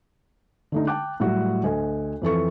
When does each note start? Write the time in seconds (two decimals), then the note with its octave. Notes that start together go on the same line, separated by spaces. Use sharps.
0.72 D3 A3 D#4
0.87 G5 A5 D6 F#6
1.20 A2 F#3 G3 F#4
1.64 D2 A4 D#5 G#5
2.22 F2 E3 A4 C#6